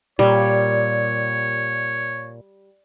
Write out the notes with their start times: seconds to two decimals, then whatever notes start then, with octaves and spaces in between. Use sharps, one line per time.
0.19 A#2 G3 C#5